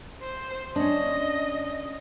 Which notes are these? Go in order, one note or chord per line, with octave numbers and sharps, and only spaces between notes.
C5
C#4 D4 D#5